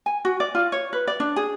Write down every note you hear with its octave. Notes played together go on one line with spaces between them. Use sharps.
G#5
F#4
D5
F4
C#5
B4
D5
D4
G#4